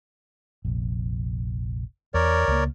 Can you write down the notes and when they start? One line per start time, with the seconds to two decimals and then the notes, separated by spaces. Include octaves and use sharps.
0.65 F1 A#1
2.14 E2 A#4 C#5 D5
2.48 C#2 A#3